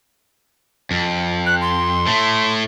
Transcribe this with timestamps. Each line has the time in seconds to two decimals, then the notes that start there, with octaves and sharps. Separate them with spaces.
0.91 F2
1.46 F#6
1.61 C6
2.07 A2 A3